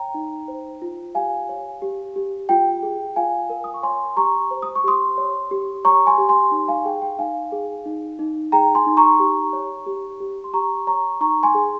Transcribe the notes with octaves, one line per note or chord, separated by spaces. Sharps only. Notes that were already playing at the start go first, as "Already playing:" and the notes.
Already playing: C#5 G5 A#5
D#4
C5
F4
G4 F5 G#5
C#5
G4
G4
F4 G5
G#4
F4 F5 G#5
A#4
D#6
C#6
C#5 G#5 C6
G4 A#5 C#6
C5
D#6
C#6
G4 C6 D#6
C#5
G4
C#5 A#5 C#6
G#5 C6
G4
G#5 C6
D#4
F5 G#5
G#4 G5
G5
D#4 F5 G#5
G#4
D#4
D#4
G#4 G5 A#5
G#5 C6
D#4
A#5 C#6
G4
C#5
G4
G4
C6
G4 A#5 C#6
C#5 A#5 C#6
D#4 A#5 C#6
G#5 C6
G#4